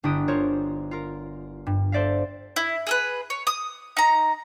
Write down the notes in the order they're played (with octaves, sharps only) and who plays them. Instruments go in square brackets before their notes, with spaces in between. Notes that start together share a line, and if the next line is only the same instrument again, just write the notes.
[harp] G1 D4 E4 G4 D#6 D7
F4 A#4 C5 C#5
F4 A#4
G2
A4 C5 D5 E5 F5
[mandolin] E4
G#4 A4 B4
C#5
D#6
D#4 A#5